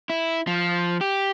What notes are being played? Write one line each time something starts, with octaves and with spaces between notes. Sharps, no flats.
E4
F3
G4